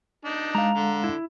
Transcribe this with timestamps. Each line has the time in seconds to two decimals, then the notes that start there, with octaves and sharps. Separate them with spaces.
0.25 D4 D#4
0.55 G#3 F5 A#5
0.76 D3
1.04 E4